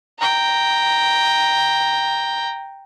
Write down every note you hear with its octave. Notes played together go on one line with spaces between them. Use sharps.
G5 A#5